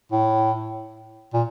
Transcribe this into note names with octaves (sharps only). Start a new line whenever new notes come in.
A2
A#2